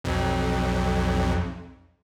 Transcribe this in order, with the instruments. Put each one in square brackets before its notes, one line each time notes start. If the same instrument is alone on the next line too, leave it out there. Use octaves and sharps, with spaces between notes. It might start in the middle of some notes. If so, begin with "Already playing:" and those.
[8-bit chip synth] B1 F2